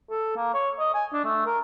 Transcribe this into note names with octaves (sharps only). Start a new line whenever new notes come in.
A4
A#3
C#5
D#5
G#5
D4
A3
A#4